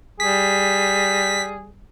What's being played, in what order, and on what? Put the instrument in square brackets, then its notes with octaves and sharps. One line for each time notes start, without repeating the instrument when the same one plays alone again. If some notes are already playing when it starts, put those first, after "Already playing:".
[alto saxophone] G3 [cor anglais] G#4 [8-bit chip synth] B6